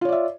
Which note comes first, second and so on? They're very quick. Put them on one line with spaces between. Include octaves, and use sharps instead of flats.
F4 C#5 D5 E5